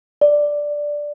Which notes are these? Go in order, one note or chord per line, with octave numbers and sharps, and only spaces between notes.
D5